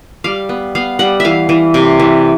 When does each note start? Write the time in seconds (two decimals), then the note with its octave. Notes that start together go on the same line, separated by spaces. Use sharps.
0.24 G3 F5
0.49 B3
0.75 B3 F5
0.99 G3 F#5
1.20 E3 E5 F5
1.49 E3
1.74 C3
2.00 E3